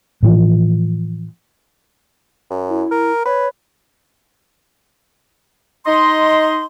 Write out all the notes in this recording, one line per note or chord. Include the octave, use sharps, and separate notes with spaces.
A2 E3 F3
F#2
E4
A#4
B4 C#5
D#4 D#5 C6